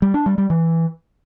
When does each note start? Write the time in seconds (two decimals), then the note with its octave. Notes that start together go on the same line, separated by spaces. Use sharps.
0.02 G3
0.14 D4
0.26 G3
0.38 G3
0.50 E3